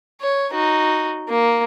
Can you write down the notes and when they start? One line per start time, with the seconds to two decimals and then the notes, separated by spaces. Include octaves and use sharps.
0.21 C#5
0.52 D#4 F#4
1.29 A#3